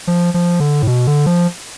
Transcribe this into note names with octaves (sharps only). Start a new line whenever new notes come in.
F3
F3
D3
A2
B2
D3
F3